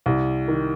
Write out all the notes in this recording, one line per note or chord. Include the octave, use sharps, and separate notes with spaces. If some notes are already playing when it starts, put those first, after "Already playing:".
C2
D#3